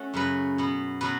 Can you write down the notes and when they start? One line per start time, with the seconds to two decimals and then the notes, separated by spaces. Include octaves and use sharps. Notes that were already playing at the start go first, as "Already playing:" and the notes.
Already playing: A3 C#4 F#4
0.14 F#2 C#3 F#3 B4
0.58 B2 B3
1.01 B2 F#3 C#4 B4